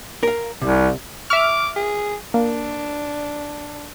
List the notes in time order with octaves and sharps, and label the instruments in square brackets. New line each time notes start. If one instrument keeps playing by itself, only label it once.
[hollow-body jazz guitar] A#4 F5
[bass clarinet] C2 [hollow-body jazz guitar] C3
[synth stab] E5 F6 [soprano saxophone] D6
[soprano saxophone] G#4
[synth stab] A#3 [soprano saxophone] D4